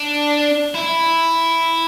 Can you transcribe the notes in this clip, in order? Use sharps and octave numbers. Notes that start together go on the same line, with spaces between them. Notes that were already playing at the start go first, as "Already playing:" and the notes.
Already playing: D4
E4